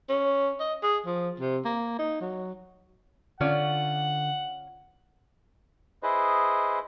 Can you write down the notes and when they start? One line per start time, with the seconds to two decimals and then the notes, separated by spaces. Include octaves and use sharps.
0.09 C#4
0.60 D#5
0.83 G#4
1.06 F3
1.40 C3
1.65 A#3
1.99 D#4
2.21 F#3
3.41 D3 C#4 F4 D5 F#5
6.03 E4 G#4 B4 C5 D#5